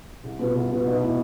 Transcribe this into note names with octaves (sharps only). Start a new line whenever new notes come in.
C2
B2 B3 F4
C2
B2 B3 F4
B1 B2
A2 E3 B3 E4